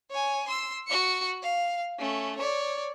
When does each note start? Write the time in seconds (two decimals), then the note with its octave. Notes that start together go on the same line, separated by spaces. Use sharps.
0.11 C#5 G#5
0.48 C6 E6
0.87 F#4 C#7
1.43 F5
1.99 A3 C#4
2.38 C#5 D5